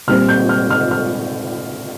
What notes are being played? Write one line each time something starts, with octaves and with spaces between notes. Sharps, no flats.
A#2 G3 C4 F6
G6
F6
F6
F6